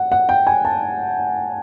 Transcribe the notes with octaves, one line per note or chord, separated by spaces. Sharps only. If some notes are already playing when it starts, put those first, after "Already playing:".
Already playing: F#5
F#5
G5
G#5
A5